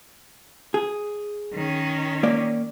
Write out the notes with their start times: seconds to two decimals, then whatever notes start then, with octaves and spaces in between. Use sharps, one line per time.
0.74 G#4
1.53 D#3 C#4
2.23 A#3 D5